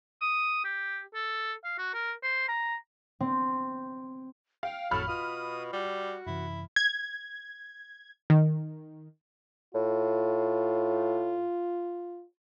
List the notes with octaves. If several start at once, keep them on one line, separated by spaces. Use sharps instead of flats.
D#6
G4
A4
F5
F#4
A#4
C5
A#5
C4
F5 G5
G#1 F2 A2 F#3 A4 B5 F6
B2 F4 F5 D#6
G3 F#4
F#2 C3 E3 E4
G#6
D#3
A2 F4